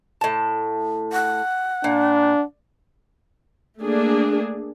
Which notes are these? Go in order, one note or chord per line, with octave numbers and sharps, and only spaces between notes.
A2 A5
F#5
A#2 D4
A3 A#3 D4 G#4